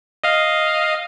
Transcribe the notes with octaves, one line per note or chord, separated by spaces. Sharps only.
D#5 F5